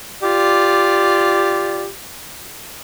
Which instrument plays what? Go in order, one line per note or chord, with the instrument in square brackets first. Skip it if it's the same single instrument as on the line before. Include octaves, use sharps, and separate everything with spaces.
[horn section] F4 G4 D5